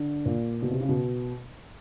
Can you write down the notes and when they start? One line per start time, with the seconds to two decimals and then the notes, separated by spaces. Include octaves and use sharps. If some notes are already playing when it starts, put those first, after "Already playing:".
Already playing: D3
0.26 A#2
0.62 B2
0.71 C3
0.80 C#3
0.89 B2